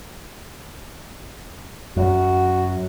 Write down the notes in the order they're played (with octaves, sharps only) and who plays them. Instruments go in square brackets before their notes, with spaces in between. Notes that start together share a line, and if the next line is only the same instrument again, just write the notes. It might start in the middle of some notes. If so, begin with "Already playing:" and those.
[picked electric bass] F#2 [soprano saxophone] F#4